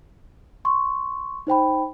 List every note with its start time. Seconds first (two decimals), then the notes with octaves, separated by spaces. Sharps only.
0.65 C6 C#6
1.47 D#4 C5 G5 B5